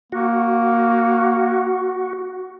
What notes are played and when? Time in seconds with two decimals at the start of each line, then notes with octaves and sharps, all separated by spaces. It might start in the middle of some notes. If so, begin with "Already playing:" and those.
0.12 A#3 F#4